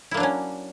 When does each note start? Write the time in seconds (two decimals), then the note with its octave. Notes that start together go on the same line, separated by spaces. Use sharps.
0.11 E4
0.14 A#3
0.17 D4
0.20 F#3
0.23 C#4